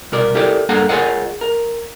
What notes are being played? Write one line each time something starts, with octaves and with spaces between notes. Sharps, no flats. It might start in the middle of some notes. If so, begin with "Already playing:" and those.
C2 B2 A#4 D5
E4 G4 A4 A#4 D5
G2 A#3 D4 A4 F#5 A#5
F4 G#4 A#4 C#5 D#5 F#5
A#4